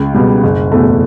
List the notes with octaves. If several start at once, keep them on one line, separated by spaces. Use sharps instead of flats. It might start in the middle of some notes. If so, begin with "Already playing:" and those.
Already playing: C#2
B2 G3
F#1
E2 B2 A3